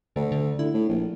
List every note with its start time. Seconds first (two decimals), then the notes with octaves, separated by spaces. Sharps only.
0.16 D2 D3
0.32 D3
0.59 D3 E4
0.74 A2
0.89 A#1